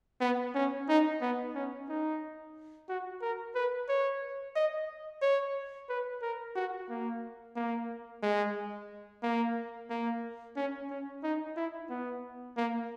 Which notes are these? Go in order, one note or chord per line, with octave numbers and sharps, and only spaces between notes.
B3
C#4
D#4
B3
C#4
D#4
F#4
A#4
B4
C#5
D#5
C#5
B4
A#4
F#4
A#3
A#3
G#3
A#3
A#3
C#4
C#4
D#4
E4
B3
A#3